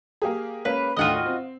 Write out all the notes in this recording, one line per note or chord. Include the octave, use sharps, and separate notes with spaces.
A#3 G4 G#4
G#3 A#3 C#4 B4
D#2 A2 D3 F4 F#4 D#5
C4